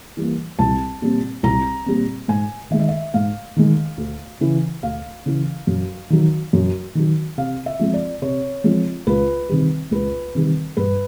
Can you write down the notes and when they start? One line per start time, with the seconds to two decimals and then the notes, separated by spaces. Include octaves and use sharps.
0.17 E3 G3 A#3
0.59 C2 A5
1.02 A#2 G3 C4
1.43 C2 A#5
1.86 A#2 G3 C4
2.28 G#2 G#5
2.70 D#3 G#3 E5
2.79 D#5
2.89 E5
3.14 G#2 F5
3.56 D#3 G#3
3.98 D2
4.41 C#3 E3
4.83 D2 F5
5.26 C#3 E3
5.67 F#2
6.10 D#3 F#3
6.53 F#2
6.95 D#3 F#3
7.37 C3 F5
7.66 E5
7.79 F3 G#3 C4
7.94 D5
8.22 C3 C#5
8.64 F3 G#3 C4
9.07 C#2 B4
9.49 C3 D#3 G3
9.91 C#2 B4
10.35 C3 D#3 G3
10.77 G2 B4